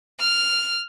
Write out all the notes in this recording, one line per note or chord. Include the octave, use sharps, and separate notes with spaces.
F6